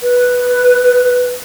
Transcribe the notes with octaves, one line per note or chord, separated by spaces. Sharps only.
B4